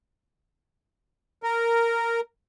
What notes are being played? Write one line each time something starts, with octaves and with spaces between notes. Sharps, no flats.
A#4